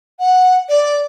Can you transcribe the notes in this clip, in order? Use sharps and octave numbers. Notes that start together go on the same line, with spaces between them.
F#5
D5